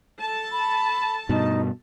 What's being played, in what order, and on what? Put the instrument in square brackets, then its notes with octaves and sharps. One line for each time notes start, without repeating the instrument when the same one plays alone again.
[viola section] A4 A5
[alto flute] B5
[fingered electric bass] G2 B2 [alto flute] D#4